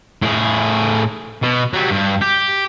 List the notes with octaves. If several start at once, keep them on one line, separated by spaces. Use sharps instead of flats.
A2 G#4
B2
F#3 G3
G2
G4